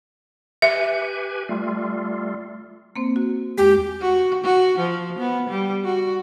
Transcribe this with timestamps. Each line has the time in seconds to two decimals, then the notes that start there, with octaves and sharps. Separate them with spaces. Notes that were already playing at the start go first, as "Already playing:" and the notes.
0.62 G4 B4 E5 G#5
1.49 G3 A3 F4
2.96 A#3 C4 C5
3.16 F#4
3.58 E2 G#3 G4
4.02 F#4
4.44 F#4
4.79 F3
5.19 B3
5.50 G3
5.84 F#4